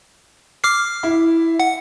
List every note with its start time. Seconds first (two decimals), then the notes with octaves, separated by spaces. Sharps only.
0.64 D6 F6 C7
1.03 E4
1.60 F#5